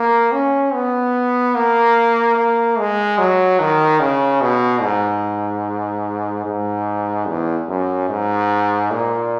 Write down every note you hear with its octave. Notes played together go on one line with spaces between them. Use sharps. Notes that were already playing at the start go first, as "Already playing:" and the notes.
Already playing: A#3
C#4
B3
A#3
A#3
G#3
F#3
D#3
C#3
B2
G#2
G#2
E2
F#2
G#2
A#2